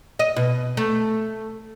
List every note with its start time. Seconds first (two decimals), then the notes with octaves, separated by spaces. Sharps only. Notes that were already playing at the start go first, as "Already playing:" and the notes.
0.19 D#5
0.36 B2
0.77 A3